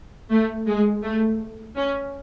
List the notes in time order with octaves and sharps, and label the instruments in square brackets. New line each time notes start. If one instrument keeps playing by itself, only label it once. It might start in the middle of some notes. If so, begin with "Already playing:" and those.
[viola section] A3
G#3
A3
C#4